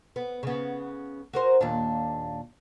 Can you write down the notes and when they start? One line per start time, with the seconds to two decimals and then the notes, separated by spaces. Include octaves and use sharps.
0.16 B3
0.43 C#3 B3
1.33 F#4 A#4 C5
1.61 D#2 A#2 D4